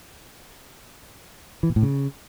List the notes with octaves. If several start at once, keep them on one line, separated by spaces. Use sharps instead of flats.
E3
A#2
A2
C#3